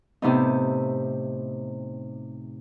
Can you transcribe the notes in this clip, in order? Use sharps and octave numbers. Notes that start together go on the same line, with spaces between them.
A2 C3 B3 D#4